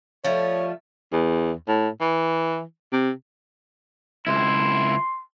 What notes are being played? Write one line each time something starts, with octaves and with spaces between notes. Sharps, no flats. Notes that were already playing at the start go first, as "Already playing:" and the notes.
F3 G3 A3 C#5
E2
A2
E3
C3
C#2 E4 C6